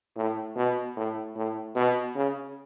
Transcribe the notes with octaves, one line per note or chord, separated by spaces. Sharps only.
A2
B2
A2
A2
B2
C#3